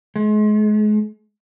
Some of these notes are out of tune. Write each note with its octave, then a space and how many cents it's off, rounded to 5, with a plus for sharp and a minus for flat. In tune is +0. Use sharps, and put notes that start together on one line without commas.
G#3 +35